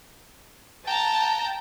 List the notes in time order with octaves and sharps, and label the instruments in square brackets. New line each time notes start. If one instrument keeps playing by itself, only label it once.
[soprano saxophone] G5 [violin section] A5 A#5